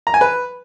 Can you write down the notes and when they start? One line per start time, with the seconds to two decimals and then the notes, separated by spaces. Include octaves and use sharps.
0.07 A#5
0.14 G#5
0.21 B4